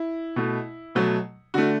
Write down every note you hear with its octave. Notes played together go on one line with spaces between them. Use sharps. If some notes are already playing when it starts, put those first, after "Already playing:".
Already playing: E4
B2 A3
B2 F#3 A3
D3 A3 F#4